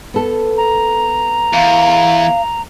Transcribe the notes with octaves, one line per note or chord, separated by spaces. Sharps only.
B3 A4
A#5
E2 F5